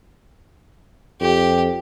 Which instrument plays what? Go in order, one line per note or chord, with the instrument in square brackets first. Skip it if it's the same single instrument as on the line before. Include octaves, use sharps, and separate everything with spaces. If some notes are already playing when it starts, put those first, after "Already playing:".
[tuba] F2 [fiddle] G4